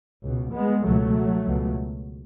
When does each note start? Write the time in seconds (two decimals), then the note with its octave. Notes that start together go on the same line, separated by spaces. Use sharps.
0.23 C#2 B2
0.53 G#3 B3
0.85 C#2 B2 F#3 A3
1.45 C#2 B2